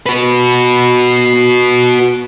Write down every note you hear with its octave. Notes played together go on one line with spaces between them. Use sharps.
F#4 B4